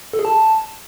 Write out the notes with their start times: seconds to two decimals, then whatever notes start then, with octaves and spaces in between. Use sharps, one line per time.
0.13 A4
0.19 G#4
0.25 A5